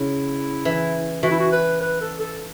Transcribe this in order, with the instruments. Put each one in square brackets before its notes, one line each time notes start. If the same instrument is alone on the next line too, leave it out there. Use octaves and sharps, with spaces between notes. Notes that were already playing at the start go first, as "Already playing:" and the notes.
Already playing: [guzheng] C#3 [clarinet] E4
[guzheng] E3
[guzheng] E3 [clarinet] F#4
[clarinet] E4
F#4
B4
B4
A4
A4